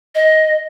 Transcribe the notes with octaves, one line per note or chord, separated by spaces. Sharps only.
D#5